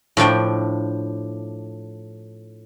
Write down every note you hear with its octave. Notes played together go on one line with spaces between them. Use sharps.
A2 F3 D4 G5